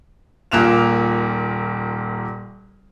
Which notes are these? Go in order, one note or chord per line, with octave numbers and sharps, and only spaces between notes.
D#1 A#2 A#3 F#6 E7 F7